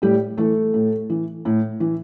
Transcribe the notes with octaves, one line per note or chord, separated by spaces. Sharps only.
A2 G3 G4
E3 A3 A4
A2
E3
A2
E3